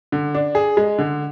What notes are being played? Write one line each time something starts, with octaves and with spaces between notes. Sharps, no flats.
D3
D4
G#4
G#3
D3